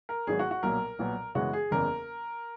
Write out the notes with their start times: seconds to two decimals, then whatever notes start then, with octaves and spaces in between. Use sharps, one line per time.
0.09 A#4
0.27 G#1 G#2 F#3 B3 G#4
0.39 F#4
0.51 F#4
0.63 B1 A#2 F#3 A#3 A#4
0.99 B1 A#2 F#3 B3
1.35 F#2 C#3 E3 G#3 B3 F#4
1.53 G#4
1.71 F#1 E2 C#3 A#4